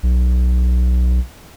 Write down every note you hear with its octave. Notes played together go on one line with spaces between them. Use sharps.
B1